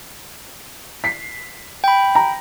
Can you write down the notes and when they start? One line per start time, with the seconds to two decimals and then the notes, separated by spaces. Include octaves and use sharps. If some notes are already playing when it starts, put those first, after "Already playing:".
1.04 B6 C7
1.84 G5 B5
2.15 A#5